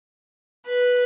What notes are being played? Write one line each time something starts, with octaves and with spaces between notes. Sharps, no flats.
B4